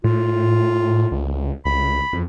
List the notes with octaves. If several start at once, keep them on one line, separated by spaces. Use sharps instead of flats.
A2 F4
C#2
C#2 B5
F2